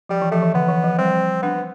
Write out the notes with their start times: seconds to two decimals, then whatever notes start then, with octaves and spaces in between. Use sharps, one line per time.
0.09 F3 G3
0.22 E3
0.32 F3 A3
0.43 E3
0.54 D3 B3
0.69 E3
0.84 F3
0.98 G3 C4
1.42 B3 D4